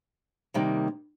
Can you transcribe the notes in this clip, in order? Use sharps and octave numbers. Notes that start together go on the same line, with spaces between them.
C3 D#3 G3 A#3